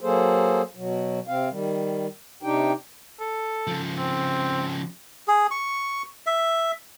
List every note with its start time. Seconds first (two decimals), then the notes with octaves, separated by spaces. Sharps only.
0.01 F#3 A#3 G#4 A4 C5
0.75 B2 F#3
1.28 C3 C4 F5
1.50 D#3 G3
2.43 C3 D4 D#4 G4 G5
3.20 A4
3.67 C#3 F3
3.98 C4
5.28 G#4
5.51 C#6
6.26 E5